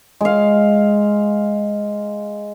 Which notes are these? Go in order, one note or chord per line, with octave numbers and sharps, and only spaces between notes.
G#3 F5